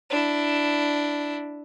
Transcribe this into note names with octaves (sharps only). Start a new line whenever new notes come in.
D4 E4